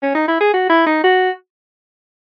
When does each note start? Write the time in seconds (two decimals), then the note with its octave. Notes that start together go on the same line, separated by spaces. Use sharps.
0.03 C#4
0.15 D#4
0.28 E4
0.41 G#4
0.53 F#4
0.70 E4
0.87 D#4
1.04 F#4